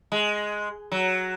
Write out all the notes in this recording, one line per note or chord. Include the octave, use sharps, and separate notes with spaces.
G#3
F#3